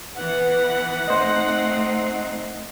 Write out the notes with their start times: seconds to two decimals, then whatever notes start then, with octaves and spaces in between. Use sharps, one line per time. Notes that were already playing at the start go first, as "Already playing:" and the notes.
0.15 E3 B3 F#5
1.08 A3 C4 D#4 C5 D#5